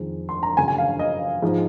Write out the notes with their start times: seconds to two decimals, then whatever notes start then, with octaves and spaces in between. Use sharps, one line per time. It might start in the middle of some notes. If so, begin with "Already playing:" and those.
Already playing: F2 D#3 G#3
0.29 C6
0.43 A#5
0.57 F#2 C#3 F#3 G#5
0.68 G#5
0.78 F5
0.99 D#5
1.42 G#2 F3 G#3